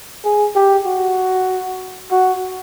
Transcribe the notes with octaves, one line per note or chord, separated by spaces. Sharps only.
G#4
G4
F#4
F#4